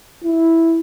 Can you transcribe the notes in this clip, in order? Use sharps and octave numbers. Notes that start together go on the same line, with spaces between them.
E4